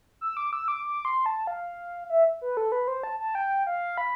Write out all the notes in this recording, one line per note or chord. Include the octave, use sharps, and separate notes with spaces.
E6
D6
E6
D6
D6
C6
A5
F5
E5
B4
A4
B4
C5
A5
A5
G5
F5
B5